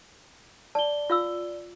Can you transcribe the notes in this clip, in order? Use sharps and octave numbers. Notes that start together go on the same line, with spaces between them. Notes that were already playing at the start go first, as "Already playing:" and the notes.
D5 A5 G7
F4 F5 E6